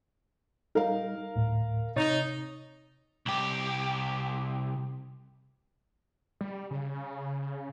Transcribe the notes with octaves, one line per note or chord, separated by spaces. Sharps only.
G3 D#4 A#4 F5
D2 A2
C3 D#4 C#5 A6
C2 G4
G3
C#3